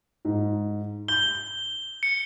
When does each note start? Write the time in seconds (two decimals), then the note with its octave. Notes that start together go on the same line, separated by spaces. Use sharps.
0.25 G#2
1.08 G6 G7
2.03 C#7